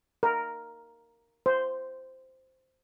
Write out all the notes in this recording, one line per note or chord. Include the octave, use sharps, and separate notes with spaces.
A#4
C5